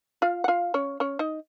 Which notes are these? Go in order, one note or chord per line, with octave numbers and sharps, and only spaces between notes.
F4 F5
F#5
F4 F5
C#4 C#5
C#4 C#5
D#4 D#5